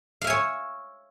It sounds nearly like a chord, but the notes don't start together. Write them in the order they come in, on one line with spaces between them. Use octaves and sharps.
F5 E5 G#5 C#5